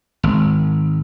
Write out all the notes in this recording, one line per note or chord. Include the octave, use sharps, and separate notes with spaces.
G#1